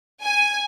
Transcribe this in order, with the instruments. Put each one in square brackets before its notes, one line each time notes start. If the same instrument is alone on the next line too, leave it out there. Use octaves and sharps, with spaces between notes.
[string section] G#5